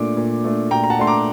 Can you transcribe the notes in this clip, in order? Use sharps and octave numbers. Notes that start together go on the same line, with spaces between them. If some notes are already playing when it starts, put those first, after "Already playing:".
Already playing: A#2 A3 D4 D6
A#2
A3 D4
A#2 G5 A#5
A#5
F#5 A5
A3 D4 C6
A#5 D6